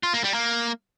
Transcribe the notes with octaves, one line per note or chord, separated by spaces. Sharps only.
F4
A#3
G3
A#3